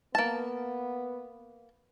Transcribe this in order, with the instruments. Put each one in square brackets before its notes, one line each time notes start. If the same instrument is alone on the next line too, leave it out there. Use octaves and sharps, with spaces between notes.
[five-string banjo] A#3 A5 [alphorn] B3